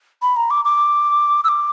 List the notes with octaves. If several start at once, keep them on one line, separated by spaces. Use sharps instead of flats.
B5
A#5
D6
D6
E6
D6